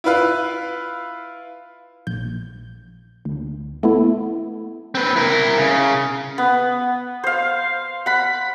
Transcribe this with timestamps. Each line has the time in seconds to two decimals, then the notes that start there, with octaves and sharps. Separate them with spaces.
0.04 E4 F4 B4 F5
2.07 A#1 G6
3.25 D2
3.83 A3 B3 E4
4.95 C4 B4
5.16 E4 A#4
5.57 C#3
6.38 B3
7.24 C5 F5
8.06 F#5 B5